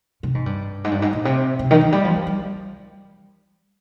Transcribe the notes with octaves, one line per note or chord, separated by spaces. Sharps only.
C3
G#2
G2
G#2
G2
G#2
A#2
C3
C3
D#3
F3
G3
F3
F3
G3